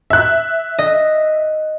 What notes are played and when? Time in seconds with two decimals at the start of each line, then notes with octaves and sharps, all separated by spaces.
0.10 E5 F#6
0.79 D#5